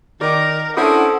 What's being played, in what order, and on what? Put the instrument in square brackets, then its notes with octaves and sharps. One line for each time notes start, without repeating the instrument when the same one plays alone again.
[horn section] D#3 [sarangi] A#4 [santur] D5
[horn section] C#4 D4 E4 [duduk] A4 [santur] C5 D#6 [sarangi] F#5